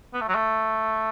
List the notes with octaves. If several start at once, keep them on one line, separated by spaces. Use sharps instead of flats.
B3
A3
F#3
A3